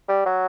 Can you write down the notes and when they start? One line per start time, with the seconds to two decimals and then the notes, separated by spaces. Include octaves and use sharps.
0.08 G3
0.26 F#3